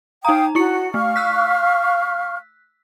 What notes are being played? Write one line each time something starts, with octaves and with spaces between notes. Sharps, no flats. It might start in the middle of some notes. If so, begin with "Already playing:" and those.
D#4 F5 G5 A#5 D#6
E4 F#4 C#6 C#7
A3 F5 C#6 F6
E6 F#6 B6